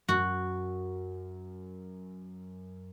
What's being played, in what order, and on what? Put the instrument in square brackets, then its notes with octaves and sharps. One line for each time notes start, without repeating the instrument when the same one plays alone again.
[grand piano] F#2 [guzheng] F#4